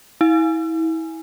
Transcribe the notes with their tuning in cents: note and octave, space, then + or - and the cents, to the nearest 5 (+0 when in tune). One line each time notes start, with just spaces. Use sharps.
E4 -30 G#5 +0